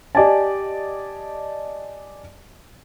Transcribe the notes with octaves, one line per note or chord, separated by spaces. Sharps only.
G4 D5 D#5 G#5 A5